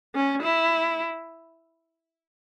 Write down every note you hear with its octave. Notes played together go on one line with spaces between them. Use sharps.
C#4
E4